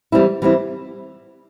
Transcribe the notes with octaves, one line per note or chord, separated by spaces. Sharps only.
E3 G3 C4 E4
E3 G3 C4 E4